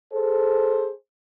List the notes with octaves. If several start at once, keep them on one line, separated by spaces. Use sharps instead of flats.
G#4 A4 C5